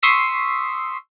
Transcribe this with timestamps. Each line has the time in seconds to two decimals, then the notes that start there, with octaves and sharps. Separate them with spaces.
0.03 C6 C#6 D#6 E6 B6 C7